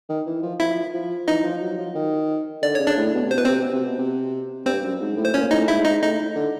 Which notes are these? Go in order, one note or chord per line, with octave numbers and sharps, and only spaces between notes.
D#3
E3
F3
F3 E4 E5
F3
E3 D#4 D#5
F3
F#3
F3
D#3
D3 D5
C#3 C#5
D4 D5
A2
B2
C3
C5
B2 B4
C3 C4 C5
B2
C3
B2
C3
G2 C4 C5
F#2
G#2
A2
C5
A#2 C#4 C#5
A2 D#4 D#5
G#2 E4 E5
G#2 D#4 D#5
A2 D#4 D#5
D3